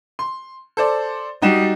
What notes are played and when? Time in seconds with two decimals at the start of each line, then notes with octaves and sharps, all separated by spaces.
0.19 C6
0.77 A4 C5 D5
1.42 G3 D#4 F#4 E7